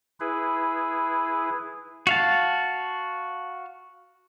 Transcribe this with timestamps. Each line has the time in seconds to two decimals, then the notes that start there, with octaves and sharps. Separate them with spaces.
0.20 E4 G#4 B4
2.07 F#4 F5 A5